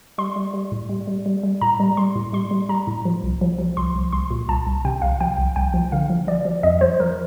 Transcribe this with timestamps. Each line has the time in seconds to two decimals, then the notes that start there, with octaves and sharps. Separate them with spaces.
0.18 G3 C6
0.36 G3
0.54 G3
0.72 A2
0.89 G3
1.07 G3
1.26 G3
1.43 G3
1.61 A2 A#5
1.80 G3
1.97 G3 C6
2.16 A2
2.33 G3 C6
2.51 G3
2.69 G3 A#5
2.87 A2
3.05 F3
3.23 C2
3.41 F3
3.59 F3
3.77 C2 C6
3.95 C2
4.13 C2 C6
4.31 A#2
4.48 C2 A5
4.67 C2
4.85 C3 G5
5.02 C2 F5
5.21 F3 G5
5.38 C2
5.56 C2 G5
5.74 F3
5.92 D3 F5
6.10 F3
6.27 F3 D5
6.45 F3
6.63 F2 D#5
6.81 F3 C5
7.00 F3 A#4